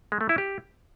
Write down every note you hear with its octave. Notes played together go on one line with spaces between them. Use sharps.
G#3
A3
E4
G4